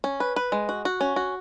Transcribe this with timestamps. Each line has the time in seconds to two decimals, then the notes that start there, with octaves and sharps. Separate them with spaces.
0.04 C#4
0.20 B4
0.36 B4
0.52 G#3
0.69 F#4
0.85 F#4
1.01 C#4
1.16 F#4